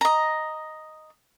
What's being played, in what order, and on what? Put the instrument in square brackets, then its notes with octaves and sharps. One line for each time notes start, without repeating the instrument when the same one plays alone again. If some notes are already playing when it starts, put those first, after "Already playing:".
[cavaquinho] D#5 A#5